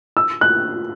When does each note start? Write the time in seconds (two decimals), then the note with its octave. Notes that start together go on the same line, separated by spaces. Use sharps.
0.17 E6
0.41 F#6